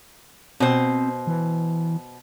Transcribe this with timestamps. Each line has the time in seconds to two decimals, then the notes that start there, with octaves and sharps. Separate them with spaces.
0.60 B2 C4 C5
1.27 E3